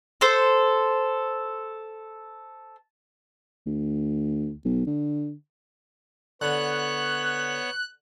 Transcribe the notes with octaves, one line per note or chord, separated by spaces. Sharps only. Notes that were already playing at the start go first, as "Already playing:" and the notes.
A4 C5
D2
B1
D3
D3 B3 C#5 F#6